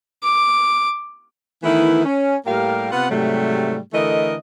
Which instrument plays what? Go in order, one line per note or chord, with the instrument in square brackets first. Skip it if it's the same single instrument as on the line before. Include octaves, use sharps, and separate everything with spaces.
[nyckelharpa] D6
[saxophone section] D#3 E3 A3 B3 E4
C#4
A2 G3 A#3 G4 A#4 F5
C3 B3 F4 F#5
G#2 C3 F#3 G3 A3
D3 E3 A3 A#4 D#5